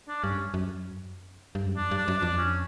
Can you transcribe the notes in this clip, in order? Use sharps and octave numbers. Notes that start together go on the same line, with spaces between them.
D4
G2 C#4
F#2
G2
F#2
F2 D4
G2
D4
F#2
F2 D4
C#4